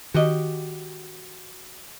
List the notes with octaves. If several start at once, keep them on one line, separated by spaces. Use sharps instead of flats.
D#3 F#4 G4 D#5